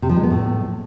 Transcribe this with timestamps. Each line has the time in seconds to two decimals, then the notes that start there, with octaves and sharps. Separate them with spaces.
0.02 C3
0.09 F3
0.16 G#3
0.23 B3
0.30 A2